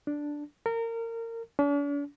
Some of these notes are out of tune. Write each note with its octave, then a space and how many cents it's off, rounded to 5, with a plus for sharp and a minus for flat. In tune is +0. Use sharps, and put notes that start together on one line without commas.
D4 +0
A#4 -25
D4 -45